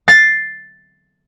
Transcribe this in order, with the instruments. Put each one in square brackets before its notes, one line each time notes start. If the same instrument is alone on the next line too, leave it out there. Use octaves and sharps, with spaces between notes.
[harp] A6 C7